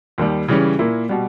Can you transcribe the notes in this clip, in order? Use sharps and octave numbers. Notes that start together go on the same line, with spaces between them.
D#2 D#3 G3
C#3 E3 G3 C#4
A#2 A#3 E4
B2 G3